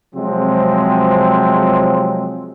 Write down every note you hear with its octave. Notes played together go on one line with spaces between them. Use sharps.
C3 F3 F#3 G#3 C4